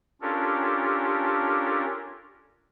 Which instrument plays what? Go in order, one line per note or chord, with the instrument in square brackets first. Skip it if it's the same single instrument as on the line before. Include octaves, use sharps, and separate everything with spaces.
[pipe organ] C#4 D4 F4 G4 A4 A#4